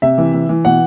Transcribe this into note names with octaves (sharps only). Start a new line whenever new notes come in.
C3 E5
E3
E3
E3
B2 F#5